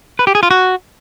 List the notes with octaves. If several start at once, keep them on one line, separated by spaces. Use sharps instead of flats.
B4
G4
G#4
F4
F#4